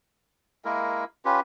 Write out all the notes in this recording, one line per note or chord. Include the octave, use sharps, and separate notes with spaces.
G#3 A#3 E4 A#4
C#4 F4 G4 B4